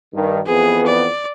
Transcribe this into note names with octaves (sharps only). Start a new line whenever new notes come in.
G2 D#3
F2 E3 B3 G#4
D5